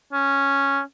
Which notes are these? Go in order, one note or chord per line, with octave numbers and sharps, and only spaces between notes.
C#4